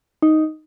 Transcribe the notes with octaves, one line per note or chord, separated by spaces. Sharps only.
D#4